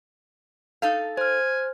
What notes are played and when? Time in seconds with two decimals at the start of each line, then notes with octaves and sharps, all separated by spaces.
0.82 D#4 A4 F5
1.17 C5 G#5 F6